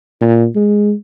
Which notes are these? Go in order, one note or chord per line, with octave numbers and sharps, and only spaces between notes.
A#2
G#3